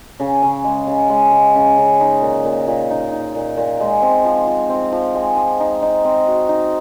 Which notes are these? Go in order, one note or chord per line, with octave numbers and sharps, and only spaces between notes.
C#3
C#3
G#3
C#3
G#3
C#3
C#3
C#3
D#4
A#2
A#2
A#2
D#4
D#4
A#2
A#2
G#3
C4
F3
F3
C4
F3
G#3
F3
D#4
D#4
C4
F#4
D#4